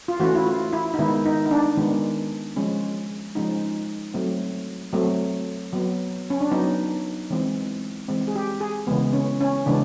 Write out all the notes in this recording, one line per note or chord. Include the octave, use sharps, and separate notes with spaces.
F4
E3 A3 C#4 F#4
E4
F4
E4
D#4
D#3 G#3 B3 E4
D#4
D#4
D4
D#3 G#3 B3 D4
F3 G#3 C#4
F3 G#3 C#4 D#4
F#3 A3 C4
F#3 A3 C4
F#3 B3
C#4
D4
F#3 B3 D#4
E3 G#3 C4
E3 G#3 C4
G#4
G4
G#4
C#3 E3 G#3 B3
C#4
C#4
C#3 E3 G#3 B3 D4